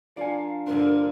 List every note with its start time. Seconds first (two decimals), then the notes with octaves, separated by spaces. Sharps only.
0.17 F3 D4 A#4 D5 F5 G#5
0.67 G2 D3 A#3 D4 A#4 C5